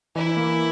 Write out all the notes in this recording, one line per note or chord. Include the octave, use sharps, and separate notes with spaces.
E3 E4
A#3